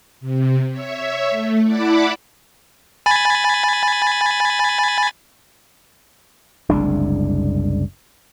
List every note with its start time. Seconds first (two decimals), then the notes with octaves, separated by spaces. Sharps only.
0.20 C3
0.70 C#5 E5
1.30 A3
1.65 E4 D5 F#5 A5 B5 D6
3.06 G#5 B5 A6
6.70 F#1 C2 G#3 D4